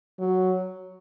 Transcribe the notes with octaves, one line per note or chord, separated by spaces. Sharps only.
F#3